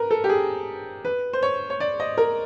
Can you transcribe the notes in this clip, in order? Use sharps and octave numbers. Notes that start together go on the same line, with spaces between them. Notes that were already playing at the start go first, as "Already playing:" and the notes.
Already playing: A#4 B4
A4
G4
G#4
B4
C5
C#5
C#5
D5
D#5
A#4